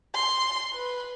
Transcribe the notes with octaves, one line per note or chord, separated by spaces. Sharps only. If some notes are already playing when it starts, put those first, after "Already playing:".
C6
B4